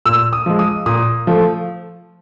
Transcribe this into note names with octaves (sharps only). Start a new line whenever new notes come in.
A#2 E6
D#6
F3 G#3
D#6
A#2 D#6
F3 A3